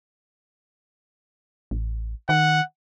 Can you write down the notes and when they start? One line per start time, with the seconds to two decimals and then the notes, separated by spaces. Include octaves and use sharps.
1.71 A1
2.29 D#3 F#5